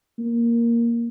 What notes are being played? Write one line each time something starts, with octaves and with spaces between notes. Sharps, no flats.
A#3